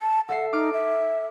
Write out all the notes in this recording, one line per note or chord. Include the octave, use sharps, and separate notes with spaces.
A5
A4 E5 F#5 C7
D#4 D6 F6 D7
E5